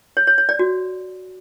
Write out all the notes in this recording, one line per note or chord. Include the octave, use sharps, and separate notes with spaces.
C#5
C#5
C#5
D5
F#4